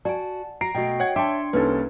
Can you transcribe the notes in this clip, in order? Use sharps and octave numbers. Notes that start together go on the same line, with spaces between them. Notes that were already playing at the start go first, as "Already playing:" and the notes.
F#4 D5 G#5 A5
F#4 A#5 A#6 C7 D7
B2 A3 F#4 D#5 G5
C#5 F#5 G5 G#6
D4 E5 G5 A5 C6 D6 C#7
C2 A#3 C#4 D#4 A4 B4